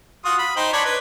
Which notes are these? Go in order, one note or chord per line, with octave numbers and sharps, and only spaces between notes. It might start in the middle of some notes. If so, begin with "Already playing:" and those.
F4 F#4 D#6
B5
D#4 C5 G5
D4 C#5 B5
B4